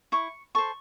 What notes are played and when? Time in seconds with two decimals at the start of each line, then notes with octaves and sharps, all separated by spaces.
0.12 E4 C#6
0.55 A4 C5 C#6